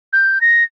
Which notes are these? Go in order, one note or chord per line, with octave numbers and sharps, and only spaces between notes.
G6
A#6